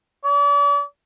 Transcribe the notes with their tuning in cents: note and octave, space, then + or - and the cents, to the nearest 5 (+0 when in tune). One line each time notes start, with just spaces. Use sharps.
D5 -40